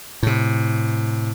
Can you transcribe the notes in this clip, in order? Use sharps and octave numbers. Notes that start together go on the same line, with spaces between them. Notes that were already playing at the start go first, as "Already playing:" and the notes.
A2 C3